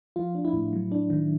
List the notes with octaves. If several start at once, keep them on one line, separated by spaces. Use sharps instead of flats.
F3 F4
D4
E4
A2
F#3
D4
D#3